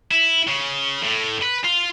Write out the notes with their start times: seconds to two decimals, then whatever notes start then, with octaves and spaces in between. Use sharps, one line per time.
0.11 E4
0.48 C#3
1.03 A2
1.42 B4
1.64 F4